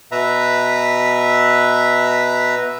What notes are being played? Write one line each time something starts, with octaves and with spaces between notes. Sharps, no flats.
B2 B4 E5 A#5